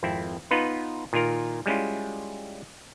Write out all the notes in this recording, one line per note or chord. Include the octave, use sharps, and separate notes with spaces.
G#1 F2 C4 E4
B3 D#4 F4 B4
A#2 D#3 F4 A#4
G3 G#3 C#4 E4 F4